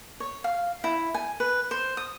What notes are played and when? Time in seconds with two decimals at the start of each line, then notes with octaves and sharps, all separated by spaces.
0.20 C#5
0.44 F5
0.84 E4
1.14 G#5
1.40 B4
1.71 C5
1.97 D#6